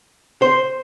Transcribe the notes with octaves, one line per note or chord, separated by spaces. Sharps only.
C5